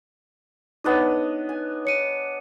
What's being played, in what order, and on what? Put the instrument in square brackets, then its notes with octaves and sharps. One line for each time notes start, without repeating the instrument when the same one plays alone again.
[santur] B3 D4 D#5 [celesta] D#4 C#5
[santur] G#5
[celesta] C#5 C#7 D#7